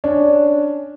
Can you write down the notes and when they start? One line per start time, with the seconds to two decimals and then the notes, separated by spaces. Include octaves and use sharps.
0.04 C#4 D4